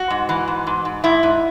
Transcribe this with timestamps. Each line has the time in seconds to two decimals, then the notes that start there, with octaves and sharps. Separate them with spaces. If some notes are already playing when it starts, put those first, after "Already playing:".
Already playing: F#4
0.10 G#2
0.29 E3
0.48 G#2
0.67 G#2
0.85 G#2
1.04 G#2 E4
1.23 G#2